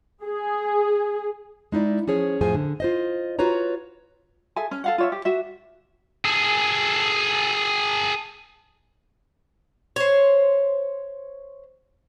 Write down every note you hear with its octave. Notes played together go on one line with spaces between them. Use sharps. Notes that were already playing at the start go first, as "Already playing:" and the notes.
G#4
G#3 D#4 E4 D5
F3 C#4 G#4 C#5
F2 A2 F3 G#4 C5 G#5
D3
F4 C5 D#5
F4 F#4 B4 C#5 A#5
G#4 A4 E5 G#5
C#4
A4 F5 F#5
F4 C#5 E5
G4
F#4 E5
G#4 A4
C5 C#5